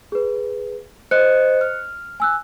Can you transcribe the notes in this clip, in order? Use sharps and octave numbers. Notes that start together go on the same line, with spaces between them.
G#4 B4
C5 D#5 F#6 C#7
F6
G#5 E6 F#6